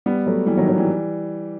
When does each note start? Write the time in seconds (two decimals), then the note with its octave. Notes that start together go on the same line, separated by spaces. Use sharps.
0.06 G3 B3
0.26 F#3 A3
0.47 E3 G3
0.57 D#3 F#3
0.68 D#3 F#3
0.78 E3 G3